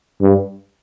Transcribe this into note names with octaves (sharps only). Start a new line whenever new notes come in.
G2